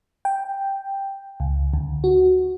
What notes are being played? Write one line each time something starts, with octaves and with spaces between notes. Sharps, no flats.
G5
C#2
D2
F#4